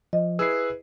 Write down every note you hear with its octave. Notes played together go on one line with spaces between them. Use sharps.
F3 D#5
E4 G#4 B4 E6 C7